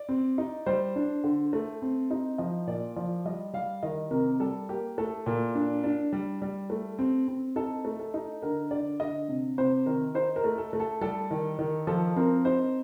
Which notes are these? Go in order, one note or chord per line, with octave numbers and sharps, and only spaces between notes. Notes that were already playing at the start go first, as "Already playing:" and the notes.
Already playing: D5
C4
D#4
G3 C5
D4
D3
A3
C4
D#4
F3 D#5
A#2 D5
F3 D5
G3 D#5
G3 F5
D#3 D#5
C3 A#4
G3 A4
A#3 G4
A3 A4
A#2
D4
D4
G3
G3
A3
C4
C4
D#4 A4
A3
A4
D#4
D3 A#4
D3 D5
D3 D#5
C3
C3 C5
D#3 A#4
D#4 C5
A#4
A3
A4
A3
A4
G3 A4
D#3
D#3
F3 A4
C4 A#4
D#4 C5